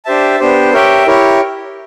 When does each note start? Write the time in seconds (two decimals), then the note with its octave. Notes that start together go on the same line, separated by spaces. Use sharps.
0.05 D4 G4 C5 E5 A5
0.40 B3 D4 G4 C5
0.73 G4 A#4 C#5 E5 G5
1.07 E4 G4 A#4 C#5